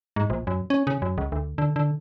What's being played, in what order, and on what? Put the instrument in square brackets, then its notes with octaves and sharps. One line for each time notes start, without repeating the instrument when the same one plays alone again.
[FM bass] G#2
A#1
F#2
C#4
C#3
F#2
C#2
D2
D3
D3